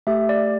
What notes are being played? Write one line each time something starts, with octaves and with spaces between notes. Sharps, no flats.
A3 G4 E5
D5